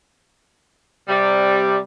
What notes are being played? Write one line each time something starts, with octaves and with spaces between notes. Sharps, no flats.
C3 G3